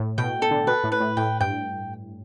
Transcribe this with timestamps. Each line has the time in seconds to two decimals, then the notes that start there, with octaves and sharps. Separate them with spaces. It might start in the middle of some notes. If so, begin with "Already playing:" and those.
Already playing: A2
0.18 B2 G5
0.42 A4
0.51 D3
0.67 B2 B4
0.84 A2
0.92 B4
1.00 A2
1.17 A2 G5
1.41 G2 G5